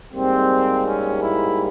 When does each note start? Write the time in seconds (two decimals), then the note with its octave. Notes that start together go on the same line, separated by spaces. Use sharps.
0.14 G#2 G3 A#3 C4
0.85 C#4
1.21 E4